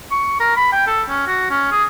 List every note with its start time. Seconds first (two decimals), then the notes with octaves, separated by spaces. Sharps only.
0.11 C#6
0.40 A#4
0.56 B5
0.72 G5
0.87 A4
1.09 C#4
1.27 F#4
1.50 C#4
1.72 G#4